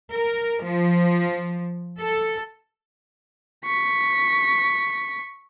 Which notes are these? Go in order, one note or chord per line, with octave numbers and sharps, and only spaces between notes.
A#4
F3
A4
C#6 B6